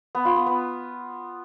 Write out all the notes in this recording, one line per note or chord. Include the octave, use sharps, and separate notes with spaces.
B3
F4
B3
B3